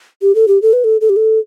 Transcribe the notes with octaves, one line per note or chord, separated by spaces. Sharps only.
G4
A4
G4
A4
B4
A4
A4
G4
A4